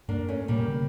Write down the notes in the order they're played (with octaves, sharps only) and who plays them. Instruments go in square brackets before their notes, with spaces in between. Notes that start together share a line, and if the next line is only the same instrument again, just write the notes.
[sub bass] G2 [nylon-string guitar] A#3 D4
[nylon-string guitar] A3 C#4
[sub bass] A#2 [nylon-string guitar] G3 A#3
[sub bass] C#3